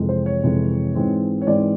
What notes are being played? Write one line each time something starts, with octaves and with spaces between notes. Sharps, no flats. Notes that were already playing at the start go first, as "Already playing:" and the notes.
Already playing: F2 C3 E3 G#3
C5
C#5
F2 C3 E3 G#3
G#2 E3 G#3 C4
C#5
G#2 E3 G#3 C4 D5